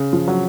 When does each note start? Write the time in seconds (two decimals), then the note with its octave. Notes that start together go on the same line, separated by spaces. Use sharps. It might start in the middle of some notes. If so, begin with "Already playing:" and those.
Already playing: C#3
0.13 F3
0.28 F#3